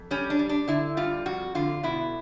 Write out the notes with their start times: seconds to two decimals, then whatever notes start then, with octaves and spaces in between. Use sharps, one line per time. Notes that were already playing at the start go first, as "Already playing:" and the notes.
Already playing: F2
0.11 G3 C#4
0.30 D4
0.39 G3
0.49 D4
0.68 D3 E4
0.97 G3 F4
1.26 F2 F#4
1.55 D3 F4
1.83 B2 E4